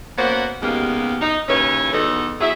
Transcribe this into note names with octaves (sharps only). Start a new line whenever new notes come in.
A#3 B3 C#4 F#4 C5
D#2 C#3 G#3 A#3 B3 G4
D#4
D#2 C#3 C#4 E4 B4 C#5
E2 B2 D#4 A4
F#3 B3 G#4 E5